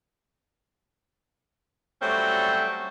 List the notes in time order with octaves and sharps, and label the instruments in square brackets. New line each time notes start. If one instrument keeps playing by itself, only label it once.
[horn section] F#3 G3 A3 C4 C#4 F#4